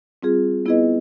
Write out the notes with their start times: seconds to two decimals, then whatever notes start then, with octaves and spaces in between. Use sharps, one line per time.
0.23 G3 C4 F4 G#4
0.66 B3 E4 G#4 B4 D#5